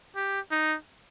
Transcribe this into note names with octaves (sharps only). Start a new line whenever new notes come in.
G4
D#4